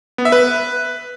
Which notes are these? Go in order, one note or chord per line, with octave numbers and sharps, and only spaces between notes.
B3
E5
B4